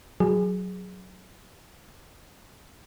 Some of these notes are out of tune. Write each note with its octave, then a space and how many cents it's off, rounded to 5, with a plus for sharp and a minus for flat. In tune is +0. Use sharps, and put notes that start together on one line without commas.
F#3 +0 G#4 +0